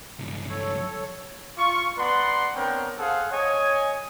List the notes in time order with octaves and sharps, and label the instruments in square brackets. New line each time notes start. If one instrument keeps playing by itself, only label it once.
[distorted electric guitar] C#2 G2
[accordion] A4 C#5
[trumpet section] F4 C#6
B3 B4 D5 F#5 A#5 C6
B3 C4 D4 A#4 C#5 G5
G#4 A4 C5 F5 F#5
C#5 D#5 G#5